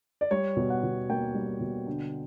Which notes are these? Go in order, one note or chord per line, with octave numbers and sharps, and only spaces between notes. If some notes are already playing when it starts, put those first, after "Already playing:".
D5
G3 C#5
B2
F#5
B2
A#3 G5
G3
B2
D3